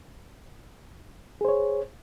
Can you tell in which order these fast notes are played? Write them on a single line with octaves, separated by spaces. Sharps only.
G#4 C5 C#5